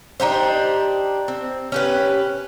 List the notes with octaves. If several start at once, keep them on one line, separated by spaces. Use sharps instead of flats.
D4 D#4 G4 C5
C4
C#4 G4 B4